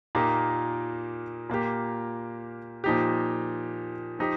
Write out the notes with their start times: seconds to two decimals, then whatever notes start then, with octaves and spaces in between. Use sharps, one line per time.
0.15 A#2 A#3 D#4 G4
1.49 A#2 A#3 G4
2.84 A#2 F3 D#4 G4
4.19 F3 D#4 G4